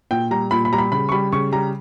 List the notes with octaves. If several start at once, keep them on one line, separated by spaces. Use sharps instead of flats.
A#2 G5
G3 A#5
A#2 B5
B5
G3 A#5
B5
C#3 B5
C#6
G3 B5
C#3 C#6
G3 A#5